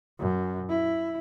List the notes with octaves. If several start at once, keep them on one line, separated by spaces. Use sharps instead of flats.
F#2
E4